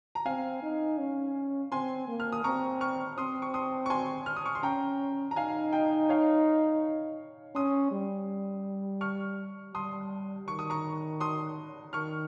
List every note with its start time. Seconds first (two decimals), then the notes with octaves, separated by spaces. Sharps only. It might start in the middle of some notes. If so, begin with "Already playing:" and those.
0.15 A#5
0.26 C4 F5 G#5
0.63 D#4
0.98 C#4
1.72 C4 G#5 C6
2.08 A#3
2.20 F6
2.32 D#6
2.44 C4 A#5 C#6
2.81 C#6 F6
3.18 C4 C6 D#6
3.42 C#6
3.54 C6 D#6
3.86 C#6
3.90 G#5 C6
4.26 F6
4.37 D#6
4.46 C#6
4.55 C6
4.63 C#4 G5 A#5
5.31 A#5
5.36 D#4 F5 G#5
5.73 D#5 G5
6.09 C#5 F5
7.55 C#4 C6 D#6
7.92 G3
9.01 C#6 F6
9.74 G3 C6 D#6
10.47 D#3 C#6
10.59 D#6
10.70 A#5 C#6
11.20 C6 D#6
11.93 D#3 C#6 F6